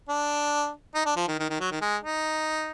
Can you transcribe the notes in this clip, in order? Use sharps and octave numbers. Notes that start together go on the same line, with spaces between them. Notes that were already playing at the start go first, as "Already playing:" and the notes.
D4
D#4
D4
F3
D#3
D#3
D#3
F#3
D#3
G#3
D#4